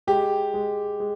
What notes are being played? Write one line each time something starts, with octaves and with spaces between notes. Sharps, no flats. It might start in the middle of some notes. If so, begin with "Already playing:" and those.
G#3 G4
G#3
G#3